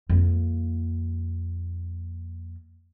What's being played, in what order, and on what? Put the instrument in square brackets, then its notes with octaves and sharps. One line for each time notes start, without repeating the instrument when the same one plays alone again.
[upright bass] F2 A#3